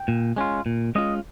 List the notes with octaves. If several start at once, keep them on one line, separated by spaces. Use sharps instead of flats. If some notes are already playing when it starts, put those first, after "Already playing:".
Already playing: G5
A#2
G#3 C#4 F4
A#2
G#3 C#4 F4 D#5